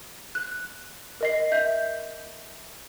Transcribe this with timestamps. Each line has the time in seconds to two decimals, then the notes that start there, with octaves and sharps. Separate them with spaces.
0.35 F#6
1.21 A#4 D#5 C7
1.52 E5 G6